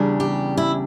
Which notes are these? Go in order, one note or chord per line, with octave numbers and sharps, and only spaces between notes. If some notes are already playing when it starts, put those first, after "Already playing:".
Already playing: E2 C#3 G3 D4
G4
E4